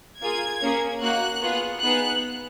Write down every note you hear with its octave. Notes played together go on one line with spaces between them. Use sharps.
A#3 F4 G#4 G#6
A#3 C#4 G#4
A#3 D#4 F#4 F#6
B3 F4 G#4
B3 D#4 G#4 F#6